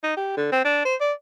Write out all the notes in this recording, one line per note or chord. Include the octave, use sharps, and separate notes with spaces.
D#4
G4
D3
C4
D4
C5
D5